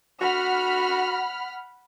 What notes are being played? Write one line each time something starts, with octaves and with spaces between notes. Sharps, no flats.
F#4 F#5 B5 F6